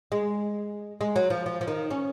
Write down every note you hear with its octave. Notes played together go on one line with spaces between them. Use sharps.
G#3
G#3
F#3
F3
F3
F3
D#3
C#4